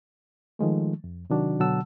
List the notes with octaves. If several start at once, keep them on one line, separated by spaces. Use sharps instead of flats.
D#3 F3 G#3 A3
F2
C3 D#3 F#3 D4 F#4
B2 D3 F#3 F#5 A5 E6